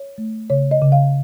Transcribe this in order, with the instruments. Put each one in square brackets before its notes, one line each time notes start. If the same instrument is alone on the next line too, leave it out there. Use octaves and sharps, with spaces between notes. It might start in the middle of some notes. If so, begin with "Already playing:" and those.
Already playing: [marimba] C#5
A3
C#3 C#5
D#5
C#3
F5